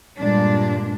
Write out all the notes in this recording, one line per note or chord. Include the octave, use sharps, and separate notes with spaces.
G2 A#2 G#3 D4